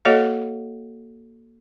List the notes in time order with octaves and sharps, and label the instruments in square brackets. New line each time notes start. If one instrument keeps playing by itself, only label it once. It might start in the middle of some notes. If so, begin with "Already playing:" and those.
[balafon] A#3 F#4 A4 C#5 D#5 F5